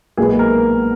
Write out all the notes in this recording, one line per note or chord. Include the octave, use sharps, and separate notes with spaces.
B1 A#2 G#3 B3 G#4
A#4